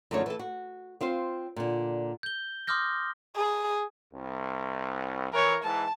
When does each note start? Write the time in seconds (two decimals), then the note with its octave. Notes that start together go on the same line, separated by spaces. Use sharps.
0.11 F#2 D3 F3 A3 D#4 C#5
0.26 E3 A4
0.39 F#4
1.01 C4 F4 C5 F5
1.56 A#2 D3
2.23 G6 G7
2.67 C6 D6 D#6 F6 G6 A#6
3.36 G#4
4.13 C2
5.32 E3 A#4 C#5
5.63 G#2 E3 A5